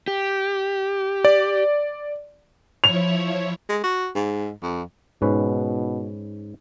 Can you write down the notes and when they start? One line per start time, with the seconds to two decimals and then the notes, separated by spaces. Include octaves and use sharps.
0.08 G4
1.25 D5
2.84 F3 E4 C#5 F7
3.69 G#3
3.84 F#4
4.15 G#2
4.63 F2
5.22 G#2 B2 C#4 B4